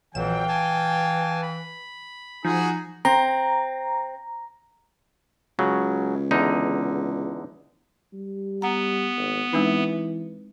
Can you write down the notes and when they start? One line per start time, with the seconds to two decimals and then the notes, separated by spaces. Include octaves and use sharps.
0.15 A#1 F2 E3 F#3 F5 G5 E7
0.49 G#5 A5
1.43 B5
2.45 F3 D#4 F#4 G#4
3.05 C4 A#5
5.59 C#2 C#3 F#3
6.31 E2 D3 D#4
8.13 G3
8.62 B3 F#5 A#5
9.16 G#1
9.53 E3 G#3 C4 D#4